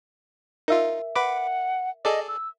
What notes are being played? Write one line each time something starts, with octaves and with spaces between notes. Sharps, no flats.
D#4 F4 A#4 E5
B4 F#5 B5 D6
G#4 A4 D5 D#5
E6